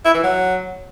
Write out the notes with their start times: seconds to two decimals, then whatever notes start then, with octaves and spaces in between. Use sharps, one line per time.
0.05 E4
0.14 E3
0.23 F#3